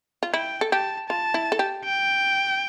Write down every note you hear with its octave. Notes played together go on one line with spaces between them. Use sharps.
F4
E4 G5
A4
G4 A5
F4 A5
E4
A4
G4
G5